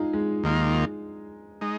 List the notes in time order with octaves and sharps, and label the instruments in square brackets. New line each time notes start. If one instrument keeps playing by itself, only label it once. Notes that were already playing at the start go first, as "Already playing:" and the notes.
Already playing: [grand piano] G#3 D#4 F4 G#4
G#3
[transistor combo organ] D#2 D#3 A#3 F4
G#3 D#4